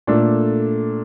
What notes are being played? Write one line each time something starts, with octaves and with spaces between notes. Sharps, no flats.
A#2 A3 D4 A4